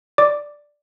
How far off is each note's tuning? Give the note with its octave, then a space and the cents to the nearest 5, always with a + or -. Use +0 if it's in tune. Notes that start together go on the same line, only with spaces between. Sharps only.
D5 +0 D6 +0